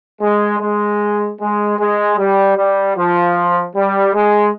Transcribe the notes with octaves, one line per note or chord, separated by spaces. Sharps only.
G#3
G#3
G#3
G#3
G3
G3
F3
G3
G#3